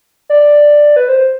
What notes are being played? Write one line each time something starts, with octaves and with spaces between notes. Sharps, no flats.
D5
B4
C5